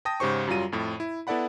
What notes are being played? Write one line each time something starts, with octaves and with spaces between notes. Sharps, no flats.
G5 A5 D#6 A#6
G#2 C#3 G4 C5 C#6
F#2 F#3 G3 F4 D#7
F2 A2
E4
B3 E4 A4 D5 F#5 B5